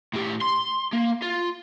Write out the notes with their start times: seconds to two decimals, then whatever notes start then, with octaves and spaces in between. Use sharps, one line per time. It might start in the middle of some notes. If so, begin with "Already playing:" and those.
0.14 A2 G4
0.41 C6
0.93 A#3
1.22 F4